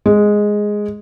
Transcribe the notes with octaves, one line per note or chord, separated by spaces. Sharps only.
G#3